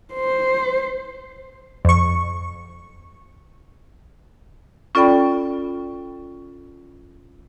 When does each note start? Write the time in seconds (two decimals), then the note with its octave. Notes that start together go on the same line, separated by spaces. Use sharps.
0.14 C5
1.85 F2 C#6
4.95 C#4 F4 A4 D5 G5 B5